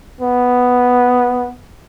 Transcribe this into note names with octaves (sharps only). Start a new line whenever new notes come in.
B3